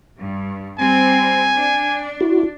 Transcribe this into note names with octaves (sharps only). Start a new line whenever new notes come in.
G2
G3 C4 G#5
D4
E4 F#4